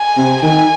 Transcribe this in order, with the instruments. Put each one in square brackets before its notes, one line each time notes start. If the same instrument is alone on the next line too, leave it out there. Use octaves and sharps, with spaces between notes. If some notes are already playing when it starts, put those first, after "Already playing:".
Already playing: [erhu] G#5
[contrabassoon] C3
[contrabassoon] D#3 [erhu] G#5